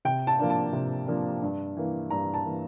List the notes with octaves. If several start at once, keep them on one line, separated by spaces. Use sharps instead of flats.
C3 G5
A5
F3 A#3 D4
A5
C3
F3 A#3 D4
G2
E3 A#3
G2 A#5
A5
E3 A#3